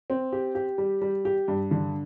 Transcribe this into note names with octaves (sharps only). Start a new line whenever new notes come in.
C4
G4
G4
G3
G3
G4
G2
D3